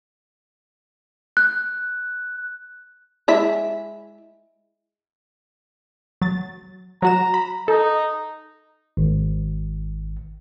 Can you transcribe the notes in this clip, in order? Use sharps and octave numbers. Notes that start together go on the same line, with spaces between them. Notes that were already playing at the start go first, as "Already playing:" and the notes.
F#6
G#3 E4 E5
F#3 A6
F#3 F#4 A#5 E7
B5
D#4 A4
G#1